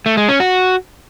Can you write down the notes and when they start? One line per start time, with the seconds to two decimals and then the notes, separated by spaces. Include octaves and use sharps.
0.06 A3
0.17 G#3
0.29 C#4
0.40 F#4